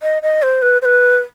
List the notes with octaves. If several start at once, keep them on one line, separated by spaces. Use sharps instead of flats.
D#5
D#5
C5
B4
C5
B4